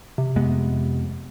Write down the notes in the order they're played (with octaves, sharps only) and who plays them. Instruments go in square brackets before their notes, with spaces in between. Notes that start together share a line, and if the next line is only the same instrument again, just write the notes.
[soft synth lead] C3
[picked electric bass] F2 G#3 B3